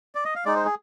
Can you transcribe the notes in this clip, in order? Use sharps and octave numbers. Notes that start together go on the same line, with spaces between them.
D5
D#5
F5
G#3 D#4 D5
C5
G#4